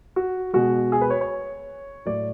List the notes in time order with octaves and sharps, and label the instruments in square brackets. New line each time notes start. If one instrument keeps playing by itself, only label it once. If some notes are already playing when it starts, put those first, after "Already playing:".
[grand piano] F#4
B2 G#3 F#4
G#4
B4
C#5
C#5
A2 F#3 D5